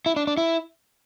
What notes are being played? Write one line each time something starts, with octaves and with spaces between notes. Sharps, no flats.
E4
D4
D4
E4